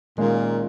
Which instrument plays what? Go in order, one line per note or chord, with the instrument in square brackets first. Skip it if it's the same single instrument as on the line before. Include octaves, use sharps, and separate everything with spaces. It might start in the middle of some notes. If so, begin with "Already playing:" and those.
[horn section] A#2 [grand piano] D#3 G#3 C#4 F4 A#4